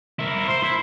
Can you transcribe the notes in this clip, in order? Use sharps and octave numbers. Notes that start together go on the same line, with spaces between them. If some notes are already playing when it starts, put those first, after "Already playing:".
E4 A#4
C5
E4